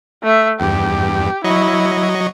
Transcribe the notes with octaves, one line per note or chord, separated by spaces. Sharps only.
A3 E5
E2 G2 G4
F#3 E4 D#5 C#6